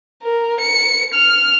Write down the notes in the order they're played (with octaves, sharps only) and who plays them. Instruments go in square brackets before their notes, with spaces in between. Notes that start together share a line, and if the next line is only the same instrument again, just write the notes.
[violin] A#4
C#7
F6